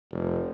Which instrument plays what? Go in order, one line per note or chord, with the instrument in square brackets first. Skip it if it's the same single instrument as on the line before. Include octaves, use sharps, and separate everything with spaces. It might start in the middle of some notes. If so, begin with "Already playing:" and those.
[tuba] F1